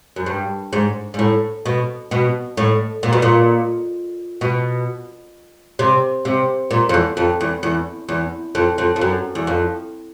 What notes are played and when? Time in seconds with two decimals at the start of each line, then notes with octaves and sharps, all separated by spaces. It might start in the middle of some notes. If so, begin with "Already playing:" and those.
0.16 F#2
0.26 G2
0.73 G#2
1.14 G#2
1.19 A2
1.66 B2
2.11 B2
2.57 A2
3.03 A#2
3.13 B2
3.22 A#2
4.41 B2
5.79 C3
6.25 C3
6.71 A#2
6.89 F2
6.94 E2
7.17 F2
7.41 E2
7.63 E2
8.09 E2
8.55 F2
8.78 F2
8.96 F2
9.01 F#2
9.35 E2
9.47 F2